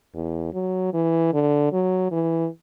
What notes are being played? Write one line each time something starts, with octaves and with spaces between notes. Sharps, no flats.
E2
F#3
E3
D3
F#3
E3